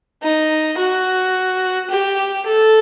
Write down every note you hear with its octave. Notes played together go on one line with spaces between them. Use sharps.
D#4
F#4
G4
A4